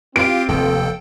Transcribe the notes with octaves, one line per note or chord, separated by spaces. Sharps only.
C4 F4 G4 F5 D7
F1 D#2 A4 G5